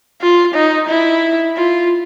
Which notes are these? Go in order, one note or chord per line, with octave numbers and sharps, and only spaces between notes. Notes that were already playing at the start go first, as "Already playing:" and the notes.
F4
D#4
E4
F4